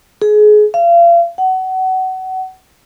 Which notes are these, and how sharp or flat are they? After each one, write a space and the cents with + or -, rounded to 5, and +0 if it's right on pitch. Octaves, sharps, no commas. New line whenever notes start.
G#4 +25
F5 -35
F#5 +25